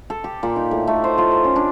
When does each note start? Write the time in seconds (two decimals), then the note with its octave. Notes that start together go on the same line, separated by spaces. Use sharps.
0.10 A4
0.24 G4
0.43 A#2
0.56 D#4
0.71 A2
0.87 A3
1.04 C5
1.18 F4
1.32 A#4
1.44 C#4
1.56 D4